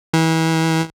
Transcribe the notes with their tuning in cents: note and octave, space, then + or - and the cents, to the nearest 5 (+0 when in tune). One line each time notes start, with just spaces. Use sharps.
E3 -30